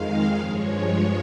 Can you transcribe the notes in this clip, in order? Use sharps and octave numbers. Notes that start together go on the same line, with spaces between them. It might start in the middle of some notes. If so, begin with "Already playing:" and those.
Already playing: F2 D#3 G#3 F5
G2 F3 G#3 C#5